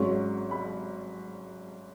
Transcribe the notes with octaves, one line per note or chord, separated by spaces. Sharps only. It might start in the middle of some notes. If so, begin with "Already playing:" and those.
Already playing: G#1 G#2 F#3 C#4
B5